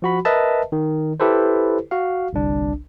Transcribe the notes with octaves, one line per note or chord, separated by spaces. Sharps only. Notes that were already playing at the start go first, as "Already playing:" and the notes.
F3 F#4 B5
A#4 B4 D#5 E5 A5
D#3
E4 G4 A4 B4 C5
F#4 F5
G1 C2 D4